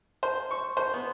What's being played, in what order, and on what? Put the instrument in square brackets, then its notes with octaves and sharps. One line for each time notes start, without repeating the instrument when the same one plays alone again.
[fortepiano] C5
C#6
C5
B3